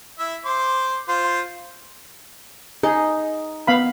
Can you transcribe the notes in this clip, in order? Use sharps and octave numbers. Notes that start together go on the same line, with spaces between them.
E4 E5
C5 C6 D6
F4 C5 C6
D#4 G#4
B3 F5 B5